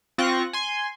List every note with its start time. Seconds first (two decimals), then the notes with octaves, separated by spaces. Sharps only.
0.18 C4 F4 C#6 F#6 A#6
0.53 G#5 C6